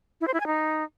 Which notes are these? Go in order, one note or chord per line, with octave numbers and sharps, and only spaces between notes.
E4
C5
E4
G#5
D#4